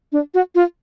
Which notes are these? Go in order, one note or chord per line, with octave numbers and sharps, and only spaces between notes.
D4
F#4
F4